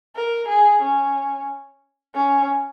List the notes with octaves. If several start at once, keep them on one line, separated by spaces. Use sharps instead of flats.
A#4
G#4
C#4
C#4